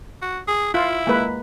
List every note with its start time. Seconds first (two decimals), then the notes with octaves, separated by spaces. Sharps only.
0.22 F#4
0.48 G#4
0.74 E4 F4
1.07 G#3 A#3 B4